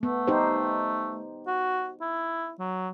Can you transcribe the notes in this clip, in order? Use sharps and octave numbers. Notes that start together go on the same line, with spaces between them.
A3 B3
D#4 G4 C5
F#4
E4
F#3